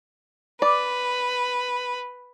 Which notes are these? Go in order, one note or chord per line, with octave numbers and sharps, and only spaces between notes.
B4 D5